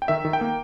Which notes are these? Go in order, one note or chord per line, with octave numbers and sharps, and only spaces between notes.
G5
D#3 E5
D#3
G5
A#3